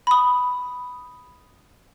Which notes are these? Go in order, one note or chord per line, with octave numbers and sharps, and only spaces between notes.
B5 D#6